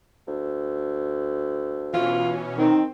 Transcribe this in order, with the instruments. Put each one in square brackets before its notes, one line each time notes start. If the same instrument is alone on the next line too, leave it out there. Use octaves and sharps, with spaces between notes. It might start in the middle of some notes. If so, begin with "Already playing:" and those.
[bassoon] D2
[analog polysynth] B2 E3 C#4 [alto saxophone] F4
[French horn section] D#3 [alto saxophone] C4